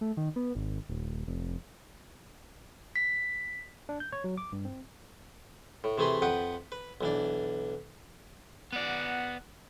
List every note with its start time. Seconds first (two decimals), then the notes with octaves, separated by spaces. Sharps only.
0.01 A3
0.17 D#3
0.36 B3
0.55 G#1
0.89 D#1
1.28 F1
2.96 B6
3.89 D4
4.00 G6
4.12 C#5
4.24 F#3
4.38 D6
4.52 G2
4.65 C4
5.84 A2
5.98 C3 E3 A3 G#4 B5 C6
6.22 F2 B4 F#5 G5 D#6
6.72 B4
7.01 B1 E3 D4
8.73 B3 D5 F#5